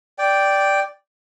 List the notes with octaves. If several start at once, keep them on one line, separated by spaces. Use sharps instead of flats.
D5 G5